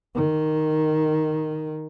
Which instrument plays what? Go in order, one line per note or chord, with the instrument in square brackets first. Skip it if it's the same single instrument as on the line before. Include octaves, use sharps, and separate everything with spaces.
[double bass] D#3